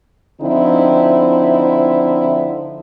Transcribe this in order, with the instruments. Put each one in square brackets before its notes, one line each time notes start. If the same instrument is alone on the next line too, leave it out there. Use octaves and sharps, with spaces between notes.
[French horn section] D3 F3 C4 D#4 E4